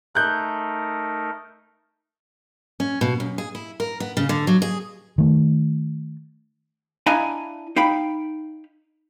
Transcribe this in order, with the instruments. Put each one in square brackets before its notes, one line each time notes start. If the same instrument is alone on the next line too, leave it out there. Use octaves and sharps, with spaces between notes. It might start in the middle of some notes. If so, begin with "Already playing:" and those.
[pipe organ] A3 D#4 A#4 [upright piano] F#6 G6
[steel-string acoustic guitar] C#4
B2
F#2
G#4
E4
A#4
B3
C#3
D3
F#3
G#4
[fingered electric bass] D#3 A3
[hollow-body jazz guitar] D4 E4 D#5 F5 G#5 A#5
D#4 F5 G5 B5